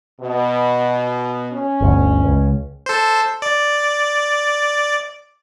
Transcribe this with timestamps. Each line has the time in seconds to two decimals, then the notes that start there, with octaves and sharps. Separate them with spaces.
0.19 B2
1.52 C#4
1.81 G1 D2
2.24 C#2
2.86 A4 C5
3.42 D5